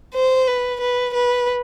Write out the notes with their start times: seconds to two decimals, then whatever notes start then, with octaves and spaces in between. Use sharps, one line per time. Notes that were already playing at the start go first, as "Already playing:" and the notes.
0.15 C5
0.48 B4
0.81 B4
1.14 B4